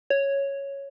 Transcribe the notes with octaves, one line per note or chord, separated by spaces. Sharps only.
C#5